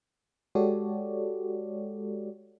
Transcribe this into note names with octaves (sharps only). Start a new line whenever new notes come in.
G#3 F#4 G4 A4 C#5 D5